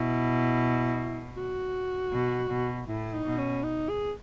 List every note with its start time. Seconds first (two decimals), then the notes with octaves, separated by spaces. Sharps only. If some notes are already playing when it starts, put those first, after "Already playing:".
Already playing: B2 E4
1.37 F#4
2.12 B2
2.50 B2
2.88 A2 E4
3.14 D#4
3.26 B2
3.38 C#4
3.63 D#4
3.89 G#4